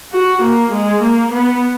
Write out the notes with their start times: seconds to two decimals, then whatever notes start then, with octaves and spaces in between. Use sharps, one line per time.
0.12 F#4
0.42 A#3
0.72 G#3
1.02 A#3
1.32 B3